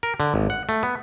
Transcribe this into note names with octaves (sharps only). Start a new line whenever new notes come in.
A#4
D3
G#1
F#5
A3
B3